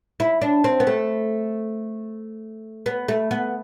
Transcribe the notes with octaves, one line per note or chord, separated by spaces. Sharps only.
E4
D4
C4
B3
A3
B3
A3
B3